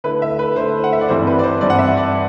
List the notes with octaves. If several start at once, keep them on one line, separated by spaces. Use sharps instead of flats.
D3 A3 E4 B4
E5
B4
D3 A3 E4 C5
F#5
E5
D5
G2 E3 G3 C4 E4 C5
B4
D5
C5
G2 E3 G3 C4 E4 D5
F#5
E5
D5